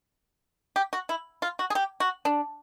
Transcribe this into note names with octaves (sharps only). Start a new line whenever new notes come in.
G4
F#4
E4
F4
F#4
G#4
G4
F#4
D4